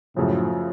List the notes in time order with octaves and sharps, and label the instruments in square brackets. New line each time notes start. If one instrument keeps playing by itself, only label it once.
[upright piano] F#2 C#3 F3 [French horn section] A2